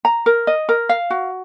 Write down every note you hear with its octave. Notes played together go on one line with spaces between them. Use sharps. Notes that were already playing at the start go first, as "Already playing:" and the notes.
A#5
A#4
D#5
A#4
F5
F#4